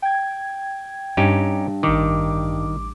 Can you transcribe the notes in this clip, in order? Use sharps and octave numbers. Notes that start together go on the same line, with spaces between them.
G5 G#6
G2 C#4 D#4 G4
A1 D#3 D6